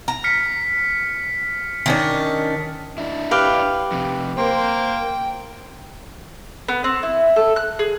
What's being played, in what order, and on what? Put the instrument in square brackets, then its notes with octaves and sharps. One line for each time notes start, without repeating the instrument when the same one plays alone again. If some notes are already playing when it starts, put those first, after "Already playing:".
[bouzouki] A#5
[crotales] F6 B6 C#7
[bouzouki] D#3 C#4 D4
[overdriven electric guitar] D4 E4
[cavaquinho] G4 B4 F5
[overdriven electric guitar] F2 C3
[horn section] A#3 C5 [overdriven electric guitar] G5
[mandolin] B3
C4
E4
A4
F#6
G#4